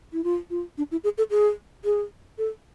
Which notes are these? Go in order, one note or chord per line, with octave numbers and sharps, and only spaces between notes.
E4
F4
F4
D4
E4
G#4
A4
G#4
G#4
A4